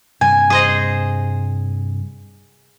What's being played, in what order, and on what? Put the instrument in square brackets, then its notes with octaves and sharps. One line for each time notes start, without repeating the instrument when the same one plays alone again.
[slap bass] G2 C3 G3 [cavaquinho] G#5
[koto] G#4 C5 D#5